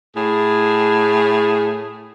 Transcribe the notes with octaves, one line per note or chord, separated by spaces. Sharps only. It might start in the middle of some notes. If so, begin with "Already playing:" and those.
A2 G#4